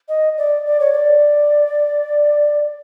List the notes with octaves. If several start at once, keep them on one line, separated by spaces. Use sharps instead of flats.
D#5
D5
D5
C#5
D5